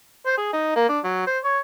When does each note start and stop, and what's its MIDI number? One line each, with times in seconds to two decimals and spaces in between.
0.26 0.38 72
0.38 0.49 68
0.53 0.71 63
0.76 0.85 58
0.89 0.99 62
1.04 1.23 54
1.27 1.38 72
1.44 1.58 73